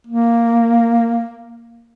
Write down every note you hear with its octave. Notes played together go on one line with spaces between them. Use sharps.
A#3